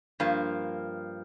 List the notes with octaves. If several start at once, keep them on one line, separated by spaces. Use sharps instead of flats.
G2 F3 A#3